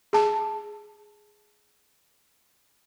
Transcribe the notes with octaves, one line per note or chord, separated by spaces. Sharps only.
G#4 A5